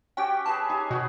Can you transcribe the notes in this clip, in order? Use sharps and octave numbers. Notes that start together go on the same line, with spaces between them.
C#4 F#4 G4 G5
G#4 B4 F5 A5
D#4 G4 G#4
B2 F#4 B4